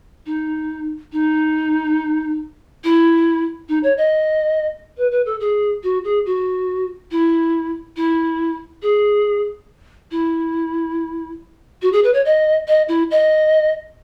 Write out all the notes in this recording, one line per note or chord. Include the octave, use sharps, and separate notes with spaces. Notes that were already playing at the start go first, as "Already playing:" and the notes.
D#4
D#4
E4
D#4
C#5
D#5
B4
B4
A4
G#4
F#4
G#4
F#4
E4
E4
G#4
E4
F#4
G#4
B4
C#5
D#5
D#5
E4
D#5